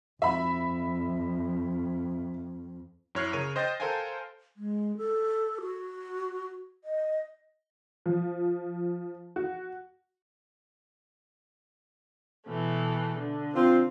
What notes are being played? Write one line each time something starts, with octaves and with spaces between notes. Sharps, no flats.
F2 E5 B5
F#2 E4 C#5 F6 F#6 C7
C#3 A#4 C#5 D#7
C5 D#5 G5 G6 A6 A#6
A4 A#4 C5 F5 G5 G#5
G#3
A4
F#4
D#5
F3
F#4
B2 E3 A3
D3
C4 F4